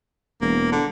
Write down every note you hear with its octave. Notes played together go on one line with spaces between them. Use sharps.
E1 A#3
D3